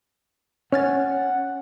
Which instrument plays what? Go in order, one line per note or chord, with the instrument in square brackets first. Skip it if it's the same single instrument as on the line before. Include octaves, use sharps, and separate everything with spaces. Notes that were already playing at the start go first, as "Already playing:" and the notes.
[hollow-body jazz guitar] C#4 [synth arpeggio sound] C#5 F6 A6 [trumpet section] F#5